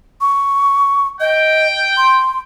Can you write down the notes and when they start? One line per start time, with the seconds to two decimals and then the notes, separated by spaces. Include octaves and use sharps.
0.21 C#6
1.20 D#5 G5
1.97 C6